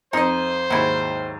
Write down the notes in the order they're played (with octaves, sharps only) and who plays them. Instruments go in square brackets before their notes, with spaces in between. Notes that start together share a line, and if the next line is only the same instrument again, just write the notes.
[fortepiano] F2 [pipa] D#4 D#5 [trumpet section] C5
[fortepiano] D#2 G#2 [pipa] F#3 E4